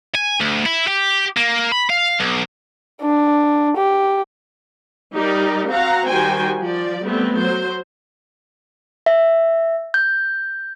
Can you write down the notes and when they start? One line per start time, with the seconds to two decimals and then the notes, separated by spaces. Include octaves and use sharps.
0.15 G#5
0.40 D2
0.66 E4
0.88 G4
1.37 A#3
1.72 B5
1.90 F5
2.20 B1
3.02 D4
3.77 G4
5.15 G3 D#4 G4 A#4 D5
5.68 C4 F#4 F5 F#5 A#5
6.08 D#3 G3 F#4 C5 G5 G#5
6.59 F3 D5
7.03 G3 A3 B3 C4
7.36 F#3 C5
9.06 E5
9.94 G6